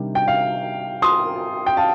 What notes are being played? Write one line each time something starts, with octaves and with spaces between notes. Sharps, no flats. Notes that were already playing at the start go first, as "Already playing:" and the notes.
Already playing: C3 D#3 G3 D4
G5
F5
C6 D#6
G5
F5 A5